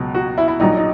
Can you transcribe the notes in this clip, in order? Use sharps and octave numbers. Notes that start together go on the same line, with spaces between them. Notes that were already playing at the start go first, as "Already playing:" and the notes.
Already playing: C#2 B2 F#3
F#4
E4
E4
A#1 A#2 F#3 D#4
D#4